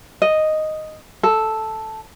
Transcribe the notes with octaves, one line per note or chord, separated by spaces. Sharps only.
D#5
A4